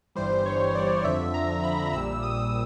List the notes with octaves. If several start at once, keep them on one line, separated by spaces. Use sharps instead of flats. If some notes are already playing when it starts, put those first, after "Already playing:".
G1 G2 E3 G3 C5
C#5
D5
F2 D3 F3 E5
A#5
B5
A#1 A#2 G3 E6
D#6